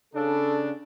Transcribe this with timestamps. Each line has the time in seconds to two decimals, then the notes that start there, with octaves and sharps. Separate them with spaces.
0.14 C#3 D4 A4